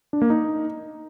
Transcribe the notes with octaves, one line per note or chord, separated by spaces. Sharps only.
D4
A#3
D#4